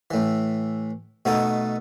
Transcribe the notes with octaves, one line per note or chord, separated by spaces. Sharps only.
A2 E3
B2 A3 B3 D#4 A4